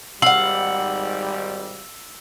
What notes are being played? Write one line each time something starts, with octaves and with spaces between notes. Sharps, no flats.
G#1 G#2 G3 F5 F#5 E6 F#7